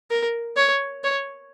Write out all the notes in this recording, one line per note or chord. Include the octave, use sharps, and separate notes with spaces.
A#4
C#5
C#5